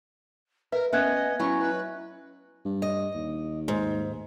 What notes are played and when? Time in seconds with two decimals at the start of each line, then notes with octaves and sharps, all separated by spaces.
0.72 A#4 B4 E5
0.93 B3 C#4 D#5 E5 F#5 F#6 G#6
1.39 F#3 C#4 E4 C#6
1.59 B4
2.65 G2
2.82 D#5
3.15 D#2
3.68 G#2